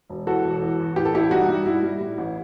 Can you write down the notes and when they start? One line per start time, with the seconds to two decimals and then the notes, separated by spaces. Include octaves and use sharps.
0.10 E1
0.27 E3 F#4 A4
0.44 E1
0.62 E3
0.79 E2
0.96 A2 G4
1.05 A4
1.14 A1 E4 G4
1.31 G3 D#4 F#4
1.49 G3
1.66 G3 E4
1.83 G3
2.01 A2
2.18 A1